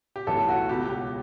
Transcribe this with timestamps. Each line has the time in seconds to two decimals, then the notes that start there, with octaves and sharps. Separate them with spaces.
0.16 G4
0.27 B1 A2 E3 A4
0.49 F#4
0.69 C#2 B2 G4
0.90 G4